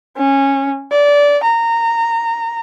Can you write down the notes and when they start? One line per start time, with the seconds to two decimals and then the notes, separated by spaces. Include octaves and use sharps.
0.17 C#4
0.92 D5
1.44 A#5